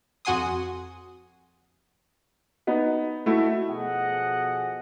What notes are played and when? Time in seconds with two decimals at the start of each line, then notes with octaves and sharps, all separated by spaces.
0.25 F2 F#4 F#5 G#5 C6 D#6
2.67 B3 D#4
3.26 A3 E4 F#4
3.69 B2 F3 G#4 A4 D#5 F#5